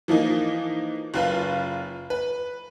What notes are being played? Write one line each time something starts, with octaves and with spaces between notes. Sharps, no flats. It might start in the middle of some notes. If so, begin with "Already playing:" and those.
E3 F3 A#3 D#4
F#1 F4 B4
B4